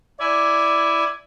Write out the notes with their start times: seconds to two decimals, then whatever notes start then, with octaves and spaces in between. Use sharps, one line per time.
0.20 E4 D5 G#5